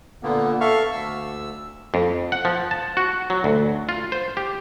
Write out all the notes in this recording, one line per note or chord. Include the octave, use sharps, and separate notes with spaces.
A#2 D3 A#3 B3
A4 E5 F5 C#6 F6
D2 E6
F2
F#5
F3
A5
F#4
F#3
D2
F4
C5
G4